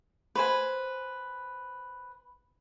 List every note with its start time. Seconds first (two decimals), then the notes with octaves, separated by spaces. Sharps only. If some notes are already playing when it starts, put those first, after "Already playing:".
0.35 B4 C5 G#5